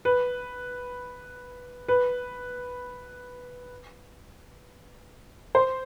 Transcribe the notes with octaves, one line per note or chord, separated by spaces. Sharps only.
B4
B4
C5